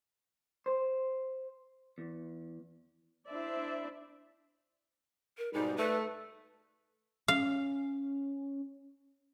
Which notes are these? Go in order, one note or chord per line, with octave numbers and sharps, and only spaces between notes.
C5
E2
D4 E4 C5 D5 E5
A#4
G#2 B2 G3 D#4
A3 B4
C#4 F5